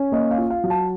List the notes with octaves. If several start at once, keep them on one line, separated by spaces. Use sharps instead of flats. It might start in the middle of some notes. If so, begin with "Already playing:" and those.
Already playing: C#4
A#3 D#5
F5
F4
F5
F#3
A5